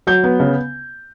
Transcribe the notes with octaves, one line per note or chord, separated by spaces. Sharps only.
F#3 G6
B3
C#3